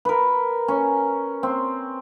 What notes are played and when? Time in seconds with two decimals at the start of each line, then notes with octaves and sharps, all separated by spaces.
0.05 A#4 B4
0.68 C#4
1.43 C4